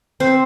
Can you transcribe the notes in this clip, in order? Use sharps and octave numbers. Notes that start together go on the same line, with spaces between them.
C4 C5